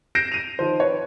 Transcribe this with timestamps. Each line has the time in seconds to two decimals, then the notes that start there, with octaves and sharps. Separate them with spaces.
0.15 G6 A#6 C7 D7 E7
0.32 D#7 F7
0.59 D#3 F3 C5
0.80 B4 C#5